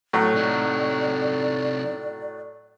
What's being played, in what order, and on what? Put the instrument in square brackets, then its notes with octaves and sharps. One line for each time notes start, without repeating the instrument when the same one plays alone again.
[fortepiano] A2 F#3 A3
[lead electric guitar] C3 D#4 [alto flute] D5